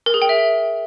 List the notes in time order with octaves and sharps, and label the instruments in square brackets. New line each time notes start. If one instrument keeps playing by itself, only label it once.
[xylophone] A#4
G#4
G5
E5